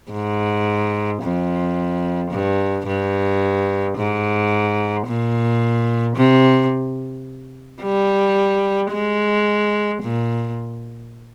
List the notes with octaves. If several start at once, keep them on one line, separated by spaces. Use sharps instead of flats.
G#2
F2
G2
G2
G#2
A#2
C3
G3
G#3
A#2